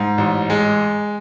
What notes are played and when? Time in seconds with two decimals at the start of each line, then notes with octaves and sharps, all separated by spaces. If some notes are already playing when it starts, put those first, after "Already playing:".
Already playing: G#2
0.18 A1
0.50 G#3